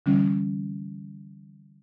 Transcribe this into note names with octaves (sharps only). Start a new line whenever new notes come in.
D3 E3 G3 C#4